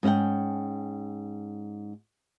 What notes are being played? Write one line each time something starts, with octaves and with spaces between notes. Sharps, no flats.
G#2 C#4 F#4 F#5 G5